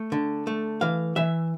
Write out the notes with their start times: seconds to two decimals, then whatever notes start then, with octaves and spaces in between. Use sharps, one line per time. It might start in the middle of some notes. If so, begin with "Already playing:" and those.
Already playing: A3
0.12 D3
0.47 A3
0.81 E3 F5
1.16 E3 E5